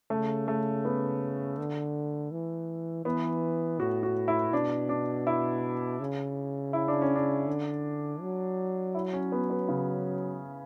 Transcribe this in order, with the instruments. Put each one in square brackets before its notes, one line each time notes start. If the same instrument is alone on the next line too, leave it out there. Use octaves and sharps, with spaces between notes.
[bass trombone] C#3 [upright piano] A3
[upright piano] A3
B3
[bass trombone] D3
E3
[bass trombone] E3 [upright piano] B3
[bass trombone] A2 [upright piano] F#4
[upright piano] F#4
E4
[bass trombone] B2 [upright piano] D4
[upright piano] D4
E4
[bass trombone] C#3
[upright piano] E4
D4
C#4
D4
[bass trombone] D3
F#3
[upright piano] E4
C#4
B3
B3
C#3